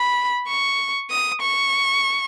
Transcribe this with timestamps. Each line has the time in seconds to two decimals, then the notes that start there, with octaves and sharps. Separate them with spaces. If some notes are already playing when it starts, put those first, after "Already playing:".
Already playing: B5
0.48 C#6
1.11 D#6
1.42 C#6